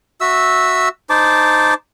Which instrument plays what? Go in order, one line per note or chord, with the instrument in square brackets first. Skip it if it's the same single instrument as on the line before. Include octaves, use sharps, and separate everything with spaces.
[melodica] F#4 E5 E6
D#4 C5 A5 D6